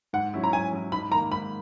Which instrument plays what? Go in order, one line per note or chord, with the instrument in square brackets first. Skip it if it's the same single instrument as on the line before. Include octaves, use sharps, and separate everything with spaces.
[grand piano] G#2 [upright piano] F#5
[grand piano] F#3 C#4 E4
[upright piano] A#5
[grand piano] G#2 [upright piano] G#5
[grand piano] F#3 C#4 E4
[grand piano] G#2 [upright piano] B5
[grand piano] D#3 [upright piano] A#5
[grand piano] A#3
[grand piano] G#2 [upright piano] B5